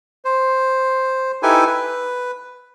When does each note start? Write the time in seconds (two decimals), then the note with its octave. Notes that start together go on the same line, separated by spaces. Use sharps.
0.25 C5
1.43 D#4 E4 G4 A4 B4 G#5
1.67 B4